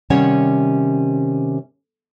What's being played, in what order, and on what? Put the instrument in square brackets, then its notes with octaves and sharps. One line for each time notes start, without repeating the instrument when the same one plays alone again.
[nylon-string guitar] C3 D#3 G3 C#4 C#5 F#5